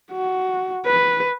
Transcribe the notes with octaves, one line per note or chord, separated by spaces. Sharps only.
F#4
B4